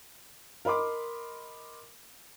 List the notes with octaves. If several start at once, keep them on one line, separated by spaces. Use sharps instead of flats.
A#4 D#5 B5 C6 D6